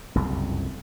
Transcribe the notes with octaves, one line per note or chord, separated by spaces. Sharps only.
F#1 C2 F2